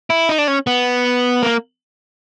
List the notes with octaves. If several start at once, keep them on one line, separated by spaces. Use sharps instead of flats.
E4
D#4
D4
C#4
B3
A#3